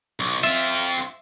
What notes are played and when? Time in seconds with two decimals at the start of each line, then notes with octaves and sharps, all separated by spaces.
0.20 B1
0.43 C4 F4 E5